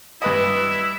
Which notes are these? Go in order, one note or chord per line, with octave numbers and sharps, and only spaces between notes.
G2 E4 B4 D#5